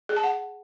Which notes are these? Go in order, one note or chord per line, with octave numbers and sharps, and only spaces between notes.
G#4
A5
F#5